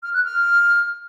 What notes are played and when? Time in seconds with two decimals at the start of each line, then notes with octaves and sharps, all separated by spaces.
0.03 F6
0.14 F#6
0.25 F6